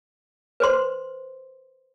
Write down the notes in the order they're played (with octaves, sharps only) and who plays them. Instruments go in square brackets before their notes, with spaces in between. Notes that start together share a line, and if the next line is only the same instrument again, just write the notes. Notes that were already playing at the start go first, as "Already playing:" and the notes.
[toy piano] B4 C5 C6